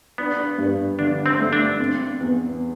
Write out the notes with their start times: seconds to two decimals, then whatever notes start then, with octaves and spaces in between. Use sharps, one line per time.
0.18 B3 D4
0.58 G2
0.99 D3 D4
1.26 C4
1.39 A3
1.53 D4
1.79 C4
2.21 E2